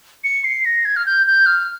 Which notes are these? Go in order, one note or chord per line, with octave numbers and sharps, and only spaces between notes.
C#7
C7
A#6
G#6
F6
G6
G6
F6